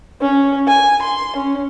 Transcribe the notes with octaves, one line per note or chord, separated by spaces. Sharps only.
C#4
G#5
C6
C#4